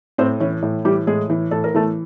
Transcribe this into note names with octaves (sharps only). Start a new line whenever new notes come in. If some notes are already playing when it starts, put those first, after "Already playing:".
A2 C4 C5
E3 C#4 C#5
A2
E3 G3 G4
A2 G#3 G#4
E3
A2 A4
A#4
E3 A3 A4